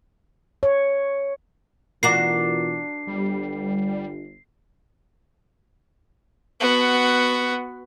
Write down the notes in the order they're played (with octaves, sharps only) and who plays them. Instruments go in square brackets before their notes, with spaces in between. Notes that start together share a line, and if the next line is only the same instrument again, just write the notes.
[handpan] C#5
[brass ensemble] B2 E3 F4 [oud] D4 F#4 A#4 [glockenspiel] C7
[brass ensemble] G1 [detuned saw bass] G3
[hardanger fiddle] B3 F#4